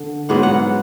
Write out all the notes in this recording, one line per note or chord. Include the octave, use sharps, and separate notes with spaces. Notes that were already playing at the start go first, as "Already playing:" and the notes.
Already playing: D3
G#2 F#3 B3 F#5
F#5